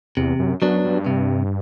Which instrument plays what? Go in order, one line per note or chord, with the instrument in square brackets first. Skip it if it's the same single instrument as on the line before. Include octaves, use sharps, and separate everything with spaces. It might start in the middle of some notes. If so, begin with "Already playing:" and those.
[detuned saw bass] E2 [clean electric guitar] C3
[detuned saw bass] F#2
[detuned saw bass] F#2 [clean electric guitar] F#3 B3 D4
[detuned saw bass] G2
[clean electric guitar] C3